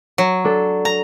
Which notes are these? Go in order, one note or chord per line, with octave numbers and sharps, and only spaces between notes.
F#3
D4 A4
A#5